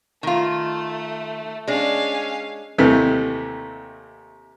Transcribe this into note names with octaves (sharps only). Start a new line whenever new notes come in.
D#3 A3 F4
G#3 C#4 D4 F5
D#2 C3 E3 A3